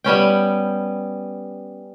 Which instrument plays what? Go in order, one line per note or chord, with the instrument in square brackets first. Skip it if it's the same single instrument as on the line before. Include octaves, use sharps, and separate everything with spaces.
[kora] G3 B3 C#4 G5